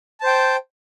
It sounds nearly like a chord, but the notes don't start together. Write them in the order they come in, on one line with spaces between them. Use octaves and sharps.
A5 C5 G5